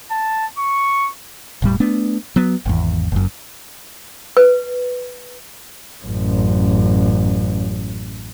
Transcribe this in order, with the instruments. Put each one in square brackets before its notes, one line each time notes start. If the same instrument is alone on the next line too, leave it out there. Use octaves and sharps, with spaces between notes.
[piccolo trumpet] A5
C#6
[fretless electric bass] E1 A2 G3
A3 B3 D4
F#3 B3
G#1 E2
F#1 F#2
[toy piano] B4
[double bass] A1 F#2